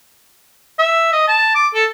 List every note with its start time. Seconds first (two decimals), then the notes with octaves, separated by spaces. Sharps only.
0.79 E5
1.13 D#5
1.28 A5
1.55 D6
1.74 A4